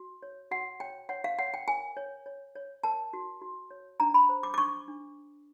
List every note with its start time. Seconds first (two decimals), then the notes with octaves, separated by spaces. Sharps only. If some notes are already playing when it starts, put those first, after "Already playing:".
Already playing: F#4
0.23 C#5
0.51 F#4 F#5
0.80 C#5 G5
1.09 C#5 F#5
1.24 F5
1.39 C#5 F#5
1.54 G5
1.68 A#4 G#5
1.97 C#5
2.26 C#5
2.55 C#5
2.84 A#4 A5
3.13 F#4
3.42 F#4
3.71 C#5
4.00 D4 A#5
4.14 B5
4.29 C5
4.43 D6
4.54 D6
4.58 D4 C#6
4.88 D4